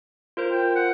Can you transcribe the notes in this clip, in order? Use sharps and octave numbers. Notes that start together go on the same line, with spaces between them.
F4 A#4 C5
G5
F#5